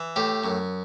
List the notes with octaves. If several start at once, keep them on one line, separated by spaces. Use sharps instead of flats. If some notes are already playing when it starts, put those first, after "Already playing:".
Already playing: E3
A2 G4
F#2